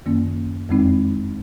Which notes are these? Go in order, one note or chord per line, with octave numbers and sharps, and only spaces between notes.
F#2 D#3 A#3 C#4
F2 D#3 G#3 C4 D#4